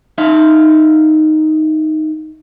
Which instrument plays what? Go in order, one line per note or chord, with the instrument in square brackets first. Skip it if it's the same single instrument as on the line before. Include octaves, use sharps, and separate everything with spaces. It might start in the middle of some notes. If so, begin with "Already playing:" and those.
[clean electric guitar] D#4 E5 F5